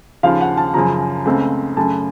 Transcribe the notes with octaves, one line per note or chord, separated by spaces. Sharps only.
D#2 C#3 F3 F5
F#5
A5
F#2 C#3 F3 A#5
C#2 C#3 A3 C4
F#2 C#3 A3 A5